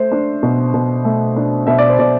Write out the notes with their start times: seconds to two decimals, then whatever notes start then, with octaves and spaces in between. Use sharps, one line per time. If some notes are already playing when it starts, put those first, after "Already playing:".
Already playing: A3 C5
0.12 D4
0.43 B2
0.74 B2
1.05 A3
1.36 D4
1.67 B2 E5
1.79 D5
1.89 C5
1.98 B2 D5